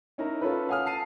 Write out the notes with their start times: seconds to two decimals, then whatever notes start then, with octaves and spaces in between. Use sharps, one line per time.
0.18 C#4 D#4 E4 A#4 A#5
0.41 C#4 F4 A4 B4
0.69 F5 F#5 G#5 D#6 F6
0.86 A5 C7 D#7